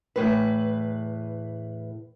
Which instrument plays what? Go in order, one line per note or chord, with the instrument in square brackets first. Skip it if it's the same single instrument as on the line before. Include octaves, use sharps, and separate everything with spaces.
[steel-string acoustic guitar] E2 A2 B4